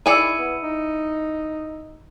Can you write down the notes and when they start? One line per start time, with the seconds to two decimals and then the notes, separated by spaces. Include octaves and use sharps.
0.06 D#3 E4 G#4 D5 E6 C#7 D#7
0.39 B3
0.63 D#4